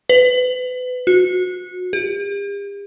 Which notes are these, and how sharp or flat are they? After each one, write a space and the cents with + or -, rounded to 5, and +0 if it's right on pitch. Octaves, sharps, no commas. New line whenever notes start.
B4 +30
F#4 -25
G4 +45